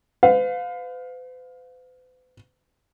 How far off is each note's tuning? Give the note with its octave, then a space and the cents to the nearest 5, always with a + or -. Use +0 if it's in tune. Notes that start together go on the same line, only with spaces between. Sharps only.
B4 +45 F5 +25